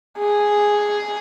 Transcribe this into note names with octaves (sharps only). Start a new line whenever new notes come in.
G#4